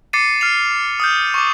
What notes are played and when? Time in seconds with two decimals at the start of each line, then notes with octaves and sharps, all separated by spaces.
0.13 D6 A6 C7 C#7 D#7
0.41 F6 C7 F7
1.00 D#6 F6 G6
1.34 C#6 D6